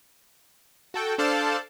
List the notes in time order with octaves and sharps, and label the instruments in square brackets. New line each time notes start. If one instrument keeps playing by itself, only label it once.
[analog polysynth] F#4 A4 G5
D4 A4 C5 D5 F5 A5